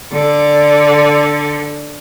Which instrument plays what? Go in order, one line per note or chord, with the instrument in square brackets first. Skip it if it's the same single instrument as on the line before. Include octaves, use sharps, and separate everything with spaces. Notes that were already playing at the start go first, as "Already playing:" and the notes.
[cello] D3 D5